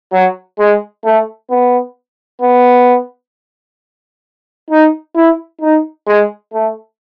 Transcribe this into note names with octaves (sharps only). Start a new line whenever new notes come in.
F#3
G#3
A3
B3
B3
D#4
E4
D#4
G#3
A3